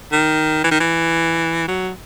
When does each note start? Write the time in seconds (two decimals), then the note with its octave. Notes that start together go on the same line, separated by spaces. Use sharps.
0.12 D#3
0.64 E3
0.71 D#3
0.80 E3
1.68 F#3